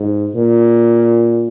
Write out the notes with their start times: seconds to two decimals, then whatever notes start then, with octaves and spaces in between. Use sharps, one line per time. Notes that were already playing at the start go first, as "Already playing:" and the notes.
Already playing: G#2
0.35 A#2